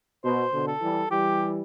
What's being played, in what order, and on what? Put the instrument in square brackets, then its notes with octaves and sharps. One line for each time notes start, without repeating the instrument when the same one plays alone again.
[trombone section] B2 [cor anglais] C5
[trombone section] B2 D3
[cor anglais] A4
[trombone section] E3 G3
[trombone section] E3 G3 [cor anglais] G4